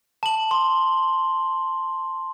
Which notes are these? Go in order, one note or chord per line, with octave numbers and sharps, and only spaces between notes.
A5 F#7
C6